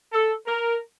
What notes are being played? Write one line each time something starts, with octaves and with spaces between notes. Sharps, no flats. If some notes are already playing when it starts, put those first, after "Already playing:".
A4
A#4